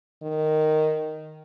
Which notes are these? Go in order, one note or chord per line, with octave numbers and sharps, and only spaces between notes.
D#3